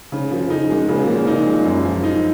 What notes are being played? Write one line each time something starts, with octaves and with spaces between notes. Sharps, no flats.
G#2 C#3
F#2 F3
F2 D#4
F#2 G#3
A#2 C#3
B2
A#2 F3
D#4
G#3
F#2
F3
D#4